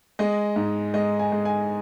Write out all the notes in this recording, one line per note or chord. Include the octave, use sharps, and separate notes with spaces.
G#3 D#5
G#2
G#3 D#5
G#5
G#3
G#5